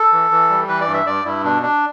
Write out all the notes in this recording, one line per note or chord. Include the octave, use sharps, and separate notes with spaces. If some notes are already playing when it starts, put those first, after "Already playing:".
Already playing: A4
E3
E3
G3
E3 B4
D5
G2
E5
G2 D5
G2 E4
B2 D4
D4